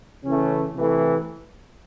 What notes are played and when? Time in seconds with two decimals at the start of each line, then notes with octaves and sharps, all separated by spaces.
0.23 C#3 E3 A3 C#4
0.75 C3 E3 A3